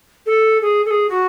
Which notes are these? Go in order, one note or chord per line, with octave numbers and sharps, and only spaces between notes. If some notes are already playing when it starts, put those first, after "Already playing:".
A4
G#4
A4
G#4
F#4